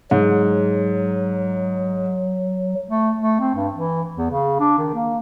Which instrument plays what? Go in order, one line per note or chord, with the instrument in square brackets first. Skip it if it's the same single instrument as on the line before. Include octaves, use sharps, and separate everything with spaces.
[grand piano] G#2 [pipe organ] F#3
[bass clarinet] A3
A3
C4
G2
E3
E2
C#3
D4
D#3
A#3